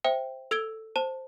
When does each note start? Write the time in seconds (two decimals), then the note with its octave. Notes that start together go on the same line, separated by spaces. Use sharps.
0.04 C5 E5 G5
0.51 A4 E6 G#6 D7 F7 G7
0.96 C5 A5 E7